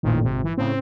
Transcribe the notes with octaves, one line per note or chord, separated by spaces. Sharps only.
A1 F2 A#2 D#3
G#1 C3
E3
A2 C#3 C4